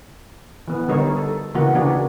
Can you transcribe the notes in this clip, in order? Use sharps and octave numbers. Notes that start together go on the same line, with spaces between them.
E3 B3
D3 G3 D#4 A#4 C#5
A4
C#3 E3 A#3 D#4 F#4
C#3 E3 A#3 D4 F#4